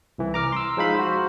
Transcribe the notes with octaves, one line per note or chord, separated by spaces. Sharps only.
C2 E3
A#5 D6 F6
C6 E6
F3 G#3 D#4 F5 B5
F#4 C5